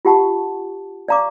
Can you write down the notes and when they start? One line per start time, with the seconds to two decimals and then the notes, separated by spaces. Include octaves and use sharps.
0.05 F4 G4 F#5 A5 C#6
1.08 D5 F5 A#5 C#6 D6